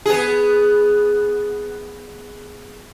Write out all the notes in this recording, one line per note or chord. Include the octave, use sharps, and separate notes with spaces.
B3 G#4